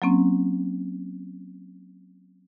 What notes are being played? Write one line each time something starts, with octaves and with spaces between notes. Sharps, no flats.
F#3 A#3 C4 C#4